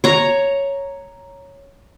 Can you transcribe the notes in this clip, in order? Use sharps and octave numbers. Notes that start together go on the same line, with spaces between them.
C#5 A#5